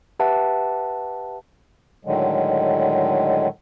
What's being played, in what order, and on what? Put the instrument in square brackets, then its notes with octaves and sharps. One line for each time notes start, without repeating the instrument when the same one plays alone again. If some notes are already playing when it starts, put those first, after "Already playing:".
[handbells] G4 B4 E5 F#5 A5
[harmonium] A2 D3 D#3 F#3 G#3